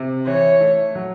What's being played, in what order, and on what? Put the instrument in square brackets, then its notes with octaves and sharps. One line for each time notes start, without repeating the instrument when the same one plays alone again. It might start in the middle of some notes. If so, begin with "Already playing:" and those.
Already playing: [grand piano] C3
[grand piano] E3 [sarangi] C#5
[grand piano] A3
F#3